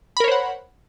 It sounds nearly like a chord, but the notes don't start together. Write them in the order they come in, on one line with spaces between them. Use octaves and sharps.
B5 A#4 C#5 C5 F#5